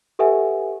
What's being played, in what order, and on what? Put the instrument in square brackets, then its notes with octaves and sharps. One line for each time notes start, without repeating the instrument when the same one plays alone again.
[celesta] G4 A4 B4 E5 F#5 G#5